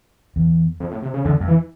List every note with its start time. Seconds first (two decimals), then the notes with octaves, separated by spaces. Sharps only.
0.36 E2
0.80 F2
0.91 A2
1.03 C3
1.14 C#3
1.25 E2 D3
1.40 F2
1.48 E3